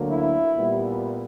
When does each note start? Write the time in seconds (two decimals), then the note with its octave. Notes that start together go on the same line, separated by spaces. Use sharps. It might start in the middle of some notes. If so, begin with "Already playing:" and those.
Already playing: D2 D3 F#3 A#3
0.09 E4
0.55 A#2 G3 B3